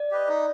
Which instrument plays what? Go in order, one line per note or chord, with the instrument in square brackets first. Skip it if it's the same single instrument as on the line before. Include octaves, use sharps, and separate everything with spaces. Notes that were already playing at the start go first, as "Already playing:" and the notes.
Already playing: [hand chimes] D5
[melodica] G4 B4 D#5
D#4